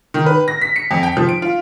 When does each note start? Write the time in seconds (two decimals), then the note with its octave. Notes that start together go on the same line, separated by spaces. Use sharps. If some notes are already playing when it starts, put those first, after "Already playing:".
0.14 D#3
0.26 B4
0.48 A#6
0.62 B6
0.76 C#7
0.91 F2
1.03 G5
1.17 F3
1.29 D7
1.42 F4